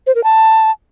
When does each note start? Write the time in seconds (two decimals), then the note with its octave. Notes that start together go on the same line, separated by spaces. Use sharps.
0.06 C5
0.15 A#4
0.24 A5